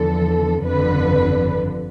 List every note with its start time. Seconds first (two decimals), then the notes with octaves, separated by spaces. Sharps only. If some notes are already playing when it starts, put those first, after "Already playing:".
Already playing: E2 D3 F3 A4
0.65 G1 F2 D3 F3 B4